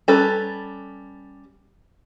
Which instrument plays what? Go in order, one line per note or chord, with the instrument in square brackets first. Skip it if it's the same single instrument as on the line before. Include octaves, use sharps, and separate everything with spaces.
[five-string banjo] G3 C#4 A4 B4 A#5